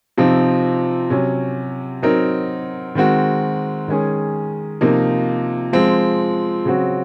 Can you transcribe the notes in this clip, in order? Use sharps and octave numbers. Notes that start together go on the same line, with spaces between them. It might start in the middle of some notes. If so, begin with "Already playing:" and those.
C3 F3 C4 D#4
C3 F#3 C#4
F#3 C4 D#4 A#4
D#3 G#3 C4 F#4
D#3 G#3 C#4 G#4
C3 F3 A#3 D#4
F3 G#3 C4
C#3 F#3 C4 F#4